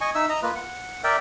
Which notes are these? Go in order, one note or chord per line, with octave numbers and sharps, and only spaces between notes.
D#5 G#5 C#6
D#4 E5 E6
D#5 A#5
A#3 F4 B4
F#5
A#4 D5 E5 G5